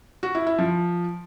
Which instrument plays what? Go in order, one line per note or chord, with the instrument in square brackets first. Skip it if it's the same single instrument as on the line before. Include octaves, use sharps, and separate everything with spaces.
[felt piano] F#4
E4
E4
F3